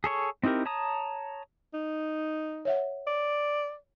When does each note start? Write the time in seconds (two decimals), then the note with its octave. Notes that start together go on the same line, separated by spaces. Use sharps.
0.04 G#4 A4 C#5 C#6
0.44 C4 D#4 E4 G4 A#4
0.65 C#5 A5 A#5 D#6
1.74 D#4
2.65 C#5 E5 F#5
3.07 D5